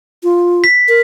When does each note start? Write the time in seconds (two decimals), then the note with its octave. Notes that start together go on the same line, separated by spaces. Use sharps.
0.23 F4
0.64 B6
0.89 A#4